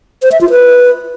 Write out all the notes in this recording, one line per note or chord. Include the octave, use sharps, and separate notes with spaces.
C5
E5
F4
B4